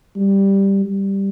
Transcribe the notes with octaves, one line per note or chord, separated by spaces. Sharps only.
G3
G3